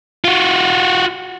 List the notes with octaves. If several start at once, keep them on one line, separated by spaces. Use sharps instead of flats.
F4 F#4